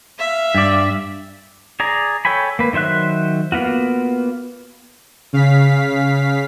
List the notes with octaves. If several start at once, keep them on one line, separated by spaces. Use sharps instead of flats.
E5 F5
G2 D5
G#4 D5 A#5
A4 C#5 G5 G#5 B5
A#3 B4
D#3 F#3 C5 E5 F#6
A#3 B3 F4 F#4
C#3 F5 B6